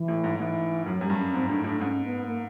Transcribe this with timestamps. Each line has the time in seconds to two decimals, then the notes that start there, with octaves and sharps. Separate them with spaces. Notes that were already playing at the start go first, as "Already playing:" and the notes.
Already playing: E3
0.08 A2
0.24 G#2
0.40 G#2 E3
0.86 F#2 F#3
1.01 F#2 G3
1.10 G2
1.17 C#4
1.34 G#2 C4
1.49 A2 D4
1.64 A2 D4
1.81 G#2 C#4
2.04 B3
2.27 A#3